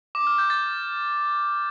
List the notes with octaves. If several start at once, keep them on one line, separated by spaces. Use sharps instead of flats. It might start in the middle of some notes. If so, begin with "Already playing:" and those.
D6
F6
G6
A6